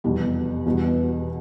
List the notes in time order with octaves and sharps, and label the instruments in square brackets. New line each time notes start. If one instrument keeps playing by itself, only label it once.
[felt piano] F1 E2 B2 G3
E1 E2 B2 G3 B3